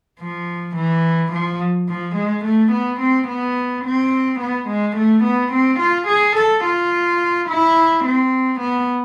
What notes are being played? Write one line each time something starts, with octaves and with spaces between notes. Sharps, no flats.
F3
E3
F3
F3
G#3
A3
B3
C4
B3
C4
B3
G#3
A3
B3
C4
F4
G#4
A4
F4
E4
C4
B3